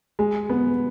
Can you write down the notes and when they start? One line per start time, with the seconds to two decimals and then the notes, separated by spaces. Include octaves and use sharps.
0.19 G#3
0.49 B3